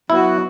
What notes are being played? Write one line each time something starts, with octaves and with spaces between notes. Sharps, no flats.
F#3 B3 E4 F#4